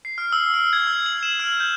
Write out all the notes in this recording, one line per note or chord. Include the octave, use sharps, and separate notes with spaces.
C7
F6
E6
F6
G#6
E6
F#7
E7
F6
G6